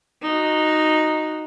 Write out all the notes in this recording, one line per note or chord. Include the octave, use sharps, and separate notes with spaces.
D#4 F#4